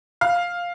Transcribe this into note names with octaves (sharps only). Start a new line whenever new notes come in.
F5